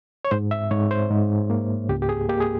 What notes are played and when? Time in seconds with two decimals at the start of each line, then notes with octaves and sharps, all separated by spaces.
0.25 C#5
0.31 G#2 C5
0.51 E5
0.71 G#2 C#5
0.91 C5
1.10 G#2
1.50 A#3
1.89 C#2 G4
2.02 G4
2.09 G#4
2.29 A#3 G4
2.40 G#4